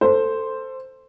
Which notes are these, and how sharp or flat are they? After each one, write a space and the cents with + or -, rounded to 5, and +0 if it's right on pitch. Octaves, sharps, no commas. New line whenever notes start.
A4 +15 C5 +0